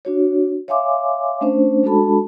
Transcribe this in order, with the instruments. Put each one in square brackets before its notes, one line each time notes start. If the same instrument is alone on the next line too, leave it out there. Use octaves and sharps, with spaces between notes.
[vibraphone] D4 F#4 C#5
C#5 E5 F5 G#5 C6 D6
A3 C#4 D4 C5
G#3 D4 F#4 A4 A5 B5